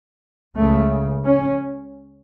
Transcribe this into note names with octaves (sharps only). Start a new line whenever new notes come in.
C#2 C#3 A3
C#4